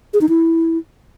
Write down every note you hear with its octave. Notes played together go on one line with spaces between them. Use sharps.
G#4
D#4
E4